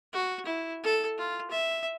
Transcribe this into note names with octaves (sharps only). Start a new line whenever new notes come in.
F#4
E4
A4
F4
E5